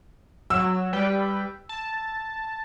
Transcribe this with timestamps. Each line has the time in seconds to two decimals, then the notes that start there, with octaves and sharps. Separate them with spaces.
0.50 F#3 E6
0.93 G3 B4 G5
1.69 A5